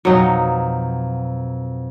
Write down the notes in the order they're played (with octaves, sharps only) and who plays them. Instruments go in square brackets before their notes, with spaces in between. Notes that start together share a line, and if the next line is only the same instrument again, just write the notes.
[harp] F2 B2 [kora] F#3 D#4